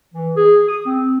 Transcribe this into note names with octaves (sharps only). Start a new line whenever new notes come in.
E3
G#4
D#6
C4